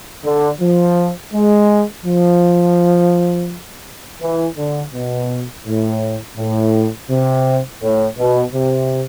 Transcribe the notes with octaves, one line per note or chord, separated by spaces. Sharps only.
D3
F3
G#3
F3
E3
D3
B2
A2
A2
C3
A2
B2
C3